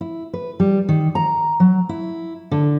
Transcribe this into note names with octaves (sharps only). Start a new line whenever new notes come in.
E4
B4
G3
D#3
A#5
F#3
E4
D3